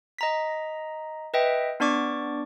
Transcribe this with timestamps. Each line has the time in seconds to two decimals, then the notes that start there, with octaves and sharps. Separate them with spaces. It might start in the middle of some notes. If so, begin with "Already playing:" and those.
0.19 D#5 A#5 B6
1.34 B4 D#5 E5 G5
1.80 B3 D4 D5 C#6 D6